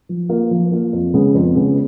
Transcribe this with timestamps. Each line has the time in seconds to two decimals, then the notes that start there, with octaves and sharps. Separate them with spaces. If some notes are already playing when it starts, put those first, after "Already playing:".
0.09 F3
0.29 A#3 F4
0.51 F3
0.71 A#3 F4
0.93 F2
1.14 C#3 G#3 B3
1.35 F2
1.55 C#3 G#3 B3